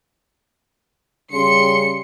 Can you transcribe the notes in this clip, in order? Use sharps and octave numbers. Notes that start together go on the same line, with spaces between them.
C#3 G3 C6 C#7